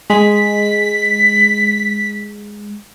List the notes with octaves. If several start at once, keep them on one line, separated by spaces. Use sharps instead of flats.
G#3 B6